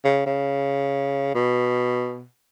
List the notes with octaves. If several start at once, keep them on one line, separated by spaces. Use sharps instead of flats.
C#3
C#3
B2